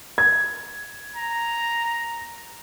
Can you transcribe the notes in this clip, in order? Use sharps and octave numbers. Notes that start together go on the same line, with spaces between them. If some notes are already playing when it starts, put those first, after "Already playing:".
G#6
A#5